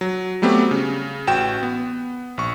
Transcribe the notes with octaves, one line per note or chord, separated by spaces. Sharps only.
F#3
F#3 G3 A3 B3 C4 G4
C#3
A1 F#4 G5 E7
B3
A#1 C#6